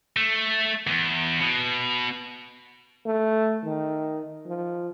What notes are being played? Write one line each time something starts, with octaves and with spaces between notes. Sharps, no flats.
A3
E2
B2
A3
D#3
F3